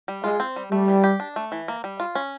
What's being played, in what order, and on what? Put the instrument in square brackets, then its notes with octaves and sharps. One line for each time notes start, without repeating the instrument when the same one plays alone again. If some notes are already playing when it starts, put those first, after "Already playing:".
[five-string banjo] G3
[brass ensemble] G#3 [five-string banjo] F4
[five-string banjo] C4
G3
[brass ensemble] G3 [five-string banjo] A3
[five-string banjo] E3
G4
D4
A3
E3
A#3
G3
F4
C#4